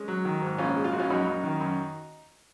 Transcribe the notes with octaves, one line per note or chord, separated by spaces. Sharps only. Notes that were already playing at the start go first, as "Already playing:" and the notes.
Already playing: G#3 C#4
F#3
D#3
G#2
A#1 C#4 F4
G#3
F4
A#1 F#4
C#4 F4
F#2 D#4 F#4
F#2
D#3
F#2